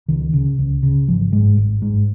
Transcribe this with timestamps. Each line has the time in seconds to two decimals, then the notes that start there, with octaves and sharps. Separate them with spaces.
0.08 C#2 D#3
0.33 C#3
0.59 C#2
0.83 C#3
1.08 G#1 F3
1.32 G#2 G#3
1.57 G#1
1.82 G#2